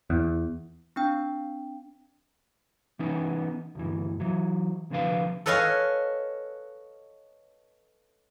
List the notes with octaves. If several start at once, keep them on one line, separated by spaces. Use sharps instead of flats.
E2
C4 D4 G5
E3 B3 C#4 D#4
D2 G2 E3
E3 F#3
C2 D3 F3 B4 F5
A4 B4 C#5 D#5 F5 G#5